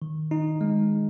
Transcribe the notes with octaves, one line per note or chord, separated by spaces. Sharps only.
D#3
D#4
G#3